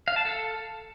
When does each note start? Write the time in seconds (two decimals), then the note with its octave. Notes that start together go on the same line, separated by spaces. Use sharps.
0.08 F5
0.16 A5
0.25 A4